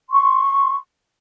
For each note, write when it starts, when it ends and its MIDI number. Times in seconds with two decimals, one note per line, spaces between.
0.10 0.76 84
0.10 0.76 85